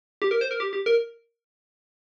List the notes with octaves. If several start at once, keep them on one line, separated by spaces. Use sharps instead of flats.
G4
A#4
C5
A#4
G4
G4
A#4